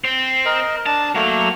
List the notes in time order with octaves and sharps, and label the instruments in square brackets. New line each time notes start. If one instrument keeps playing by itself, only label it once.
[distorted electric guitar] C4
[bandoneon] A#4 D#5
[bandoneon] D4 [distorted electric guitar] A5
[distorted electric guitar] F#3 [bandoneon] A3 A#3